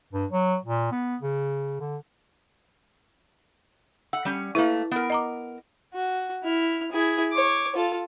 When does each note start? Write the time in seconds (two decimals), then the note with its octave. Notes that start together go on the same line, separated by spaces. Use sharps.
0.13 G2
0.31 F#3
0.64 A#2
0.91 B3
1.21 C#3
1.80 D3
4.13 F#5 E6
4.25 G3 C#4
4.55 A3 A#3 E4 B4
4.91 B3 A#4
5.10 D#5 A#5 D6
5.94 F#4
6.43 E4 F6
6.91 E4 G#4
7.32 C#5 D6
7.75 F4 A4